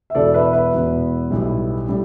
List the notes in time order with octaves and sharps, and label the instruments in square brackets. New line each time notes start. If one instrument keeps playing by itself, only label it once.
[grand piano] E5
E1 E2 B2 B3 A4 D5
B4 E5
B4 E5
E1 E2 B2 B3
B1 A2 G3
A2 G3